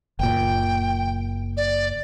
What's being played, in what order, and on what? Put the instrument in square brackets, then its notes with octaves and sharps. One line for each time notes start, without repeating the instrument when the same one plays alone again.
[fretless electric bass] F#1 A#2 [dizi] G5
[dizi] D5